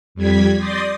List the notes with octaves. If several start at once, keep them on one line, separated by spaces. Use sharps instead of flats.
F2 G3 G#6 B6
D5 C6 D#6 G6 A6 A#6